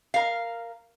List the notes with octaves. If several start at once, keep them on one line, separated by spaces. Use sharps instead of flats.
A#4 F5